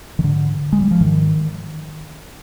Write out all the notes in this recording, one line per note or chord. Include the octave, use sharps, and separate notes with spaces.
D#3
G#2 D3
G#3
G3
F3
G#2 D#3